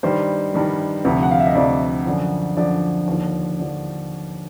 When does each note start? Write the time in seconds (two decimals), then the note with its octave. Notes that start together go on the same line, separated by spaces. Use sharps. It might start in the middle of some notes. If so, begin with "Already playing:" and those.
0.03 G2 D#3 G3 C5
0.54 G2 D#3 G3
1.05 D2 C3 F3
1.23 F#5
1.31 F5
1.40 E5
1.47 D#5
1.55 D2 C3 F3 D5
2.06 F#2 D3 F3
2.57 F#2 D3 F3 D5
3.07 D#2 D3 F3
3.60 D3 F3